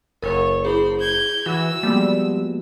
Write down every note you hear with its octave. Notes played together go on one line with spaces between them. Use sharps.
F#1 A#4 C#5
E4 G#4 C5 B5
G6 G#6
E3 F#4 E6
F3 G3 G#3 A#3 B3